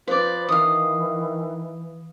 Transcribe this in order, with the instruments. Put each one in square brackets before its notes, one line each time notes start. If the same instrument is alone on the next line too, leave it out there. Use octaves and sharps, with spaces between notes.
[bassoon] F3 [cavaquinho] B4 D5 [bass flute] C5
[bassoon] D#3 [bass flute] E3 [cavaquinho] F5 D#6